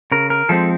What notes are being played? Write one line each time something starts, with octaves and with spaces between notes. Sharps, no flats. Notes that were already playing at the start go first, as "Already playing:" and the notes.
C#3 A#4
A#4
F3 G#3 C4 A4